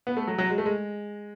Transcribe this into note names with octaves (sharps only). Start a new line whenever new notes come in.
B3
A3
F#3
F#3
G#3
A3
G#3